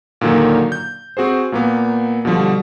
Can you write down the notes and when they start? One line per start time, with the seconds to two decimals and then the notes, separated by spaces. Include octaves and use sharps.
0.21 A#2 D3 D#3 F#3 A#3
0.72 G6
1.17 C4 F#4 G#4 C5
1.52 A#2 A#3 B3
2.25 B2 D3 F3 G3